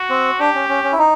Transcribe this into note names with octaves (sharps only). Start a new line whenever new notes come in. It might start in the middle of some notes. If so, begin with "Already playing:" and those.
Already playing: F#4
C4
D4 G4
C#4
C#4
C#4
E4
D#4